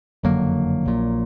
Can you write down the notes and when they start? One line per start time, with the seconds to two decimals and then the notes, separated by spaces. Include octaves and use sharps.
0.23 F#1 F2 D3 F#3 A#3
0.85 A#1 A#2